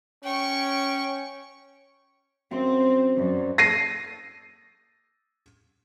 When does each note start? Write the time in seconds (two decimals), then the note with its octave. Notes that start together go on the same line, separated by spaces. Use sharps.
0.24 C#4 G5 C#6
2.51 F#2 C4 C5
3.19 F#2 D5
3.58 A#6 C7 D#7